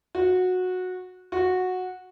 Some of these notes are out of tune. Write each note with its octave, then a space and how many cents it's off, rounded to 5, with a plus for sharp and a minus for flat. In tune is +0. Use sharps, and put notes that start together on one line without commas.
F#4 -15
F#4 -10